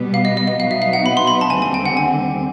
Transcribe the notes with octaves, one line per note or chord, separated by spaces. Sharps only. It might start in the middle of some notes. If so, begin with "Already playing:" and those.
Already playing: B2 G3 B3
F5
D#5
D#5
D#5
B2 F#3 B3 D#4 F5
E5
F5
F#5
B5
C6
B5
A5
D#2 D3 G3 C4 G#5
G#5
G5
F#5
G#5